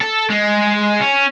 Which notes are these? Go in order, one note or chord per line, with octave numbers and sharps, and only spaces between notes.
A4
G#3
C#4